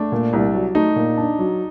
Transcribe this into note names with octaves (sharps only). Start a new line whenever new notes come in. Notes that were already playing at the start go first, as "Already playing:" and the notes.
Already playing: A3 D4
A#2
C2
F#3
A3 D#4
A#2
D4
F#3